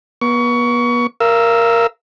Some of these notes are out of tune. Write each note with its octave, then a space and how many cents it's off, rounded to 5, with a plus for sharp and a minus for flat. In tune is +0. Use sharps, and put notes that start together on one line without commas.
B3 -35 C#6 +25
A#4 +0 F5 -30 E6 -10